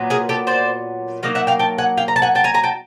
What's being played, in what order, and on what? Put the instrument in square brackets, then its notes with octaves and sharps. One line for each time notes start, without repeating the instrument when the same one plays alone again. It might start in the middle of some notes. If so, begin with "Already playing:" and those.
Already playing: [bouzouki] A#2 F#3 B3
G#4 A#4
G4 A4
C5 D5
F#3 A#3 D#4 D#5 F5
E5 F#5
F5 G5
G5 A5
F#5 G#5
F5 G5
A#5
A5
F#5 G#5
G5 A5
G#5 A#5
G#5 A#5
G5 A5